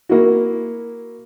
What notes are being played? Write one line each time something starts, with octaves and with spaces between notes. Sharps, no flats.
A#3 E4 F#4